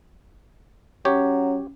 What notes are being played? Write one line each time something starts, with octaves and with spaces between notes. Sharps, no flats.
F#3 C#4 G4 C#5